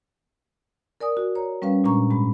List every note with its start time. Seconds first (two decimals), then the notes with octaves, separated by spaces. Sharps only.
1.01 A#4 D5 G#5 D#6
1.17 F#4
1.35 C#5 A#5
1.62 G3 C#4 B4 F5
1.84 A#2 G#3 D4 A#5 C#6
2.10 G#2 G#3 B5